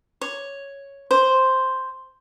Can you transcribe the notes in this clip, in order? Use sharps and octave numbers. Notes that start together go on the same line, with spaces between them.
C#5
C5